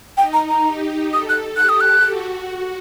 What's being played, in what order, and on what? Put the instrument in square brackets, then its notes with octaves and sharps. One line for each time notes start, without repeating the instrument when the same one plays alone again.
[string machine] D#4 [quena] G5
[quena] A#5
A#5
[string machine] G4
[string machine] A4 [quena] D#6
[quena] F#6
[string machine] G4 [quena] F#6
[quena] D#6
F#6
[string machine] F#4